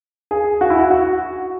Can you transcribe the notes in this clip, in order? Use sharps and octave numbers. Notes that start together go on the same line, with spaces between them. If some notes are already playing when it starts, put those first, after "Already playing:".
G#4
F#4
E4
F#4
F#4